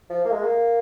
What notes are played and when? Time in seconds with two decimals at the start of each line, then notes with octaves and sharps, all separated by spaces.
0.10 F3
0.25 A#3
0.32 G#3
0.43 A#3